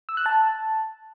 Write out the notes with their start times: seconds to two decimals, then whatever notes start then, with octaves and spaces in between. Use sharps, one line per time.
0.09 E6
0.17 F#6
0.26 A5